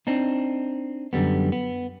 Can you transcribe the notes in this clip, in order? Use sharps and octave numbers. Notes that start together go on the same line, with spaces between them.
C4 D4 D#4
F#2 D3 G3 B3
B3